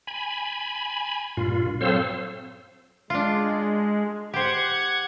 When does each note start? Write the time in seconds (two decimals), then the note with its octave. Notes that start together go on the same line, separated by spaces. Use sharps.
0.07 G#5 B5
1.37 G2 A#2 F4
1.81 F#3 C4 A4 C5 F5 E6
3.10 G#3 D4 F4
4.34 G4 C5 F#5 G#6